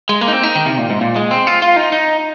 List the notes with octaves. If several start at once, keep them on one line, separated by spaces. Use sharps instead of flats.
G#3
A#3
D#4
C4
D#4
D#3
C3
A#2
G#2
A#2
G#3
C4
F4
F4
D#4
D#4